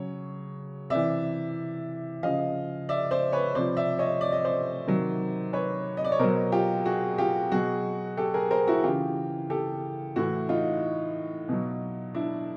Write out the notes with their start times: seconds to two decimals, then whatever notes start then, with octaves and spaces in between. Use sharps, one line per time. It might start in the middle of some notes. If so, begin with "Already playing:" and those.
Already playing: C#3 F#3 C#5
0.90 C3 E3 D5 E5
2.23 C#3 F3 D#5 F5
2.89 D5 E5
3.11 C5 D5
3.32 B4 C#5
3.55 C3 F3 C5 D5
3.77 D5 E5
3.99 C#5 D#5
4.21 D5
4.32 D#5
4.45 C5 D5
4.87 C3 D#3 F#3
5.53 B4 C#5
5.97 D#5
6.04 D5
6.12 C#5
6.19 B2 F#3 A#4 C5
6.52 F4 G4
6.85 F#4 G#4
7.18 F4 G4
7.52 B2 F#3 F#4 G#4
8.17 G4 A4
8.34 G#4 A#4
8.51 A#4 C5
8.67 E4 F#4
8.84 C#3 E3 F4 G4
9.50 G4 A4
10.16 A2 E3 E4 F#4
10.49 D#4 F4
11.49 B2 F#3
12.14 D4 E4